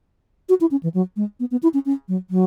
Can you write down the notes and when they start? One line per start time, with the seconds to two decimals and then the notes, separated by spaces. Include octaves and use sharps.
0.49 F#4
0.61 E4
0.71 C#4
0.83 E3
0.94 F#3
1.16 G#3
1.40 B3
1.51 B3
1.63 E4
1.74 C#4
1.86 C#4
2.08 F#3
2.30 F#3